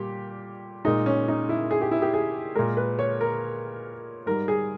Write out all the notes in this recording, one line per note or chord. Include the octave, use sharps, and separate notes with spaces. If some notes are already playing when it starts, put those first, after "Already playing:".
Already playing: A#2 G3 G4
A#2 G#3 D#4
C#4
D#4
E4
G#4
G4
E4
G4
G#4
A#2 G#3 A#4
B4
C#5
A#4
G#2 G3 A#4
G#4